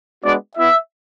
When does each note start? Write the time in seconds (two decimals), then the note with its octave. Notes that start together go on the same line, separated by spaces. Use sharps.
0.24 G#3 B3 D4 F#4 D5
0.57 B3 E4 E5